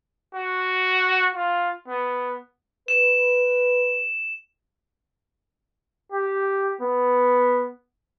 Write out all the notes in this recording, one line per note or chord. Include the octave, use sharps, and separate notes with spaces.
F#4
F4
B3
B4 E7
G4
B3